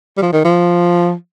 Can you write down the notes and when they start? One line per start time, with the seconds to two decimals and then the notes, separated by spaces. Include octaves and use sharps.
0.17 G3
0.22 F3
0.33 D#3
0.45 F3